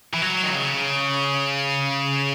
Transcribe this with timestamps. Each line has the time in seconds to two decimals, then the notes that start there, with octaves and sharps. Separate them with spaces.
0.14 E3
0.22 F#3
0.44 D#3
0.52 C#3